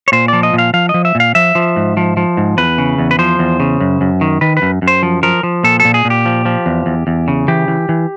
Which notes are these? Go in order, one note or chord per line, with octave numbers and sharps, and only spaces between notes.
C#5
A#2 C5
F3 D5
D#5
A#2 F5
F3 F5
D#5
F3
E5
A#2
F5
F3 E5
F3
G#2
F3
F3
G#2
E2 B4
C#3
E2
B4
F3 C5
E2
C#3
F#2
F#2
D#3
D#3 B4
B4
F#2
F#2
C5
F3
F3 A#4
F3
A#2 A4
A4
A#2
G#4
A#2
G4
F3
F3
E2
E2
E2
C#3
E3 G4
E3
E3